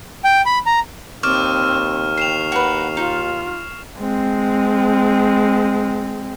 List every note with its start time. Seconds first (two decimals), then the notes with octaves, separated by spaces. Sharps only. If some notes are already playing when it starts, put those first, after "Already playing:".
0.24 G5
0.46 B5
0.66 A#5
1.23 D#2 C4 D5 C#6 F6 E7
2.18 C5 G5 C7 E7 F7
2.52 F#4 A#4 B4 F#5
2.97 D#4 F4
3.99 G#3 C4